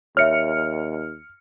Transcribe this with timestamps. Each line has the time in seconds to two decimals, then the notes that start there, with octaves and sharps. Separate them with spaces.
0.17 D#2 C#5 E5 F6 C#7